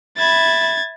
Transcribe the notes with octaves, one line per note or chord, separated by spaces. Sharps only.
E5 B5 G#6 A6